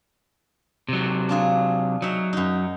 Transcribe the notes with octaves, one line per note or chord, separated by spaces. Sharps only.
C3 F#3
D4 F4 G#4
F#3 D#4 E5
F#2 D#4